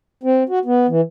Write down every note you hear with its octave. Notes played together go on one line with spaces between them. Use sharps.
C4
F#4
B3
E3